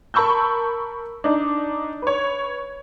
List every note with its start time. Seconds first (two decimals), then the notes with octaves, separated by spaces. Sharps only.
0.14 A#4 A5 B5 C#6 E6 G6
1.24 D4 D#4
2.02 B4 C#5